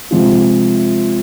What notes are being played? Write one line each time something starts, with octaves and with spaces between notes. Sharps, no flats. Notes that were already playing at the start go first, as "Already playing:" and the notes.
C3 F3 G#3 C4 F4